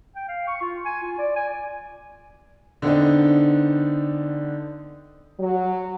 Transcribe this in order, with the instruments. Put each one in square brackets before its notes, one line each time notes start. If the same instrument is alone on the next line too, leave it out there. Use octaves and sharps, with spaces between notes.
[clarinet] G5
F5
C#6
F4
G#5
F4
D5
G#5
[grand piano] D3 B3 C4 D4 D#4
[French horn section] F#3